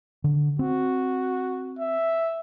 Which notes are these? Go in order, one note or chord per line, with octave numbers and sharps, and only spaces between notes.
D3
C4 F#4
E5